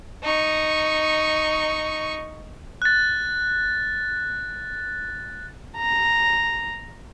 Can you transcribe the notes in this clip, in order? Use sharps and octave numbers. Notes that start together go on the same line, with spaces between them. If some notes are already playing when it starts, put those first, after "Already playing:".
D#4 C#6
F#6 A6
A#5